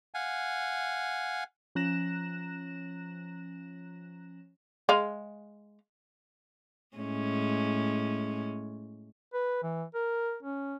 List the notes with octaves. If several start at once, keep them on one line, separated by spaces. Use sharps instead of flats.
F5 F#5 G#5
F3 C#4 A#5 F#6 A#6 E7
G#3 F5
A2 G#3 C#4
B4
E3
A#4
C#4